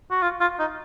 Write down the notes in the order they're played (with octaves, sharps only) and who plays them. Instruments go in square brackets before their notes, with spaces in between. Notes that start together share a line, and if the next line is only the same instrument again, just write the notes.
[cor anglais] F#4
F4
F4
D#4